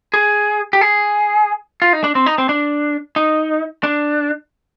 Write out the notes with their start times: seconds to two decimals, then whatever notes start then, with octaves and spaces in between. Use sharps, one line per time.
0.14 G#4
0.73 G4
0.81 G#4
1.82 F4
1.93 D#4
2.04 D4
2.15 C4
2.26 D#4
2.38 C4
2.49 D4
3.16 D#4
3.83 D4